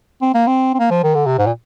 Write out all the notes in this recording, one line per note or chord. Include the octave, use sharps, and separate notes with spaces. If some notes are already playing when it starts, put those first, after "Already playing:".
C4
A#3
C4
C4
A#3
F3
D#3
D3
C3
G#2
A#2